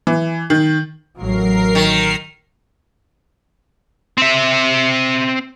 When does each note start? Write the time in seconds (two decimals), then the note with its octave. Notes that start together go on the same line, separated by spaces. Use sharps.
0.07 E3
0.50 D#3
1.17 A1 F#3 A#4 C7
1.75 D#3
4.18 C4 E5